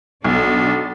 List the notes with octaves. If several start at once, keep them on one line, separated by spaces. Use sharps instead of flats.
B1 D4 F#4 A4